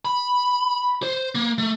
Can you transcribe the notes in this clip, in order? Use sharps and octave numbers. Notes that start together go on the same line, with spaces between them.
B5
C5
A#3
A3